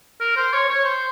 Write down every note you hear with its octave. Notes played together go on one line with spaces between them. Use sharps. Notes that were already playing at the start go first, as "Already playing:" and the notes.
A#4
C5
C#5
C#5
C5